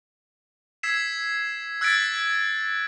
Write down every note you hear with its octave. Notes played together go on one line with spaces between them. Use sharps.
E6 G#6 B6 C7 E7
E6 F#6 G#6 A6 B6 D7